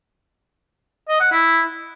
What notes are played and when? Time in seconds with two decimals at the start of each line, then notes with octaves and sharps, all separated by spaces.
1.09 D#5
1.20 F#5
1.32 E4